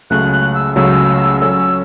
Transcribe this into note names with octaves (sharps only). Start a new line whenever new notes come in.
C#2 C#3 F#3 A3 F#6
F#6
E6
C#2 C#3 F#3 A3 E6
F#3 C#4 A4 C#5 E6